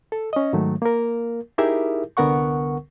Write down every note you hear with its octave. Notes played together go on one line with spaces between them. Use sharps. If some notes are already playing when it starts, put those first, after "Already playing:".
A4
C#4 D#5
G#2 D#3 F#3 A3
A#3 A#4
D#4 E4 G4 G#4 A#4 E5
C2 D3 B3 A#4 F#5 C#6